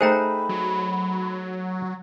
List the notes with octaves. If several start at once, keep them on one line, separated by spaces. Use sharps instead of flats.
A3 D#4 G#4 C5 G5 A#5 B5
F#3